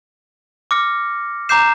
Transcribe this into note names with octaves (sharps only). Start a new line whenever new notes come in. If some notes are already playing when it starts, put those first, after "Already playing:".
D6 F6 A#6 C#7
A#5 D6 G6 C7 E7